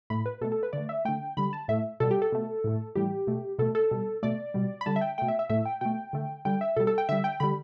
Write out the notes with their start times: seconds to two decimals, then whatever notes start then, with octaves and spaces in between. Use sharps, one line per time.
0.10 A2 A3 B5
0.26 B4
0.41 B2 A4
0.45 A3
0.52 A4
0.63 B4
0.73 D3 A3 D5
0.89 E5
1.05 D3 A3 G5
1.37 D3 G3 B5
1.53 A5
1.68 A2 A3 E5
2.00 B2 G3 A4
2.11 G4
2.22 A4
2.32 B2 A3
2.64 A2 A3
2.95 A2 E3 G3 G4
3.27 B2 A3
3.59 B2 A3 A4
3.75 A4
3.91 B2 G3
4.23 B2 A3 D5
4.54 B2 G3
4.81 B5
4.86 D3 G3 A5
4.96 E5
5.01 G5
5.18 B2 A3 G5
5.28 E5
5.39 E5
5.49 A2 A3 E5
5.65 G5
5.81 B2 A3 G5
6.13 D3 A3
6.45 D3 G3 G5
6.61 E5
6.76 B2 G3 A4
6.87 A4
6.98 G5
7.09 D3 G3 E5
7.24 G5
7.40 D3 G3 B5